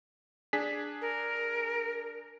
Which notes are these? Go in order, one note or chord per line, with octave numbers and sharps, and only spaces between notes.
D4 G#4 B6
A#4